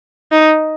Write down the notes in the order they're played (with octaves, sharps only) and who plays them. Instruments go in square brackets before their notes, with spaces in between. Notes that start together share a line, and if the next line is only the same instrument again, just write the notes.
[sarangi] D#4